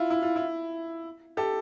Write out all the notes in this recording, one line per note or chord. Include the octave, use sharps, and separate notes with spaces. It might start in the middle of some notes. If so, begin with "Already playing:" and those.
Already playing: E4 F4
E4
F4
E4
G4 A4